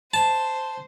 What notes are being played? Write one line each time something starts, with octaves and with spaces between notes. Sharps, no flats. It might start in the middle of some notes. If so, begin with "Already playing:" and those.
C5 A5